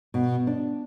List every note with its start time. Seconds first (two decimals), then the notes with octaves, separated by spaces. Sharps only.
0.14 B2
0.47 D4